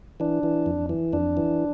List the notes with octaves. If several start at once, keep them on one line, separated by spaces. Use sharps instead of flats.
E3 D4
E3
F2
E3
F2 D4
E3